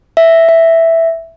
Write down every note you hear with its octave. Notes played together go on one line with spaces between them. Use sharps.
E5
E5